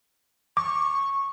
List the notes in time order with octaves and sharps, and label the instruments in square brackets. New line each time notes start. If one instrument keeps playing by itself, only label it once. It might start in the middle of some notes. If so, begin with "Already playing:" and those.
[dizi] C#6 [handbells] D6